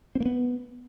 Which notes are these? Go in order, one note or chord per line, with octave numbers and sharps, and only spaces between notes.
C4
A#3
B3